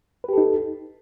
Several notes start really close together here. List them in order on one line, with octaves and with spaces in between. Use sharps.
B4 G4 A4 D#4